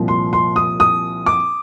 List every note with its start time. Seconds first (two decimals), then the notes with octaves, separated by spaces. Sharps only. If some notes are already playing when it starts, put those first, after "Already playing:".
Already playing: C2 A#2 F3
0.08 C6
0.33 C6
0.56 D#6
0.80 D#6
1.26 D6